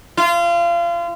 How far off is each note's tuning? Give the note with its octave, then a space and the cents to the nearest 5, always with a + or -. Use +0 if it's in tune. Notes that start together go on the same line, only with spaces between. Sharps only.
F4 -30